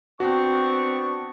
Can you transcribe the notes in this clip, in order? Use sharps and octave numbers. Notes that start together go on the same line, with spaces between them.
B3 C4 D4 F#4 C#6